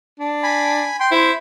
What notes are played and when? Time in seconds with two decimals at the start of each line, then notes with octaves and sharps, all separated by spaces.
0.20 D4
0.43 G#5 B5
1.00 G5 C6
1.12 E4 C5